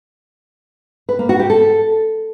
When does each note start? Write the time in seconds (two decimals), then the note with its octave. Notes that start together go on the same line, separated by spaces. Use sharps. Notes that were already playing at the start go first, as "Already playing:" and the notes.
1.09 B4
1.19 A#3
1.29 F#4
1.39 G4
1.50 A4